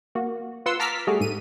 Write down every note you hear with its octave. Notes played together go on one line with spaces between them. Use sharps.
A#3 F#4
F4 B4 F#5 C6 E6
A5 A#5 D6 E6 F6 B6
G3 A3 F#4 G#4
G#2 D#7